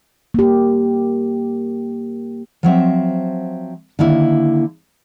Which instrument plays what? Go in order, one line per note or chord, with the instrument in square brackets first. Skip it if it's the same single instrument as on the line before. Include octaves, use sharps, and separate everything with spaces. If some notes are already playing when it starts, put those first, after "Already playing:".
[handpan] A#3 G4
[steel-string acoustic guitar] F3 F#3 C4 E5
D3 D#3 A#3 E4